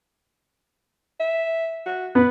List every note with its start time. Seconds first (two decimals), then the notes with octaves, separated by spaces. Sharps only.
1.20 E5
1.86 F#4
2.15 B3 B4